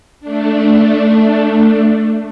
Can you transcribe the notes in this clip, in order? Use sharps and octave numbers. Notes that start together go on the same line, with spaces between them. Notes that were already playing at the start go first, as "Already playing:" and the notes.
A3 D4